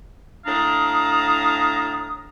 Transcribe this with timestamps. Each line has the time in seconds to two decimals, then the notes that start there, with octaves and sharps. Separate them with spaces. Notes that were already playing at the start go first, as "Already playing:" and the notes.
0.46 A2 D4 F5 A#5 D#6